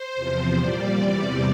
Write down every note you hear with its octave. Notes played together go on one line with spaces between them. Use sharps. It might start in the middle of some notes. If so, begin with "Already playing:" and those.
Already playing: C5
E2 C3 F3
A#2 G3 D5
E2 C3 G3